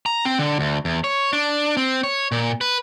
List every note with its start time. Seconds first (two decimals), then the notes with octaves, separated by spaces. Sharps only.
0.06 A#5
0.25 C4
0.39 D3
0.60 D2
0.85 E2
1.04 C#5
1.33 D4
1.77 C4
2.03 C#5
2.32 A#2
2.61 B4